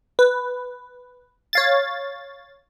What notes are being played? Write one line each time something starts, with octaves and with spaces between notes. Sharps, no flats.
B4
C#5 F5 A6